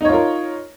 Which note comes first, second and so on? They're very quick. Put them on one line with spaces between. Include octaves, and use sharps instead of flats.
D#4 C#5 F4 A#4